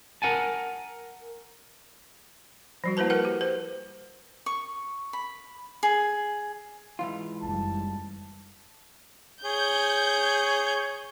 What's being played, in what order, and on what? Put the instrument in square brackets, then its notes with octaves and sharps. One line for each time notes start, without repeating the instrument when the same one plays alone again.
[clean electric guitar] A#4 F#5 G#5 A5
[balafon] F3 G3 F#4
A#3 E4 B4 C5 A5
A#4 B4 F#5 G5
G4
C5
[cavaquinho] C#6
B5
G#4
[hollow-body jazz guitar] G#2 E3 F4
[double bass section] F#1 G3 [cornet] A5
[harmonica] G#4 C#5 [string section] G6